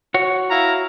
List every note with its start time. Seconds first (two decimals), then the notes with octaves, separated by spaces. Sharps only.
0.14 F#4 C#5
0.50 E4 F5 A#5